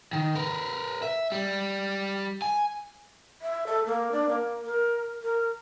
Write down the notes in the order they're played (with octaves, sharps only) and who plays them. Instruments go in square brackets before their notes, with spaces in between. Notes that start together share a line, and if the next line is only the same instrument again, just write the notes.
[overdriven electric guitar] D#3
A#4 B4
E5
G3
G#5
[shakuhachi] E5
A4
A#3
D4
A#3
A#4
A#4